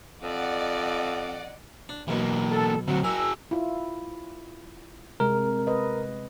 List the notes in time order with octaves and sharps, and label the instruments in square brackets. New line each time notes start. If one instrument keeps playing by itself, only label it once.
[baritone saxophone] F2 [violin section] D5 D#5 F#5
[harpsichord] D4
[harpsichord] B1 B2 [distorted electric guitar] E3 A#3
[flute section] A4
[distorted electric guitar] D2 C4 [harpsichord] F#3 [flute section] F#4
[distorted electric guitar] F#4 G#4 [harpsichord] A#4 [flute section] D#5 E6
[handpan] E4 F4
[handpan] C3 G#3 [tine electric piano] A#4
[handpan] B4 D#5